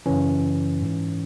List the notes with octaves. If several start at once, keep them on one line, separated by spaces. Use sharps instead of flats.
F#2 C#3 E3 C#4
G#2 E3